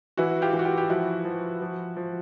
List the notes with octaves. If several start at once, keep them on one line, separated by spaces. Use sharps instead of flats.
E3 E4 F#4
F4 G4
E3
F#4
F4 G4
G4
F3 E4 F#4
F3
F3
F3